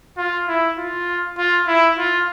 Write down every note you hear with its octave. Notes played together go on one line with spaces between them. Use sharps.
F4
E4
F4
F4
E4
F4